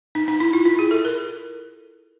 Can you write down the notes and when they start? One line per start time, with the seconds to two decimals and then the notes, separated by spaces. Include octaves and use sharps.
0.15 D#4
0.28 D#4
0.40 E4
0.53 F4
0.66 E4
0.79 G#4
0.91 A4
1.05 A#4